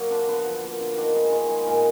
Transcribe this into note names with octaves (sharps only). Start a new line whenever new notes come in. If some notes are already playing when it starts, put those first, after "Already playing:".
Already playing: F#3 A#3
D3 D4
D3 B3
F3
A#3
D3
D#3 D4
G#3 D#4
D#3 D#4 F4
G#3 G#4
A#2 A#4